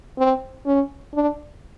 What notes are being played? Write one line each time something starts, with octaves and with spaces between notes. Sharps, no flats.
C4
C#4
D4